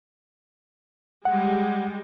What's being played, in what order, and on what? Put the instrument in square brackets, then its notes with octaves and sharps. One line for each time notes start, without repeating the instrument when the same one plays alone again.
[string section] G3 G#3 [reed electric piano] F#5